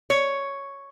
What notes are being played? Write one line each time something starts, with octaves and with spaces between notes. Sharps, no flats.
C#5